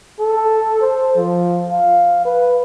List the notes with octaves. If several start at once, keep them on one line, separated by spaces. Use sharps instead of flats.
A4
C5
F3
F5
B4